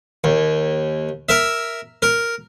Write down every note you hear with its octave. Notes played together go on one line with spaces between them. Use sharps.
D#2
A#4 E5
A#4